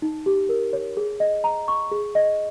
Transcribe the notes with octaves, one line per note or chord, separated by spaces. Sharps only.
D#4
G4
A#4
C#5
G#4
D#5
A#5
C#6
G#4
D#5